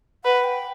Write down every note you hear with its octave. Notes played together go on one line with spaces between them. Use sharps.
B4 F#5
G5